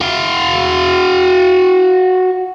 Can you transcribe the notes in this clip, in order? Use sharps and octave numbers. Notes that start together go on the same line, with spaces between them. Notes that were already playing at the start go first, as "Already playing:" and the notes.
F#4 F5